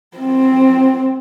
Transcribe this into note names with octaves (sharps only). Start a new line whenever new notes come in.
C4